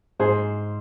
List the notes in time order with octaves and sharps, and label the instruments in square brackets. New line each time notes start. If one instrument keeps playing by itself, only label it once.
[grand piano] G#2 [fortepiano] G#4 C5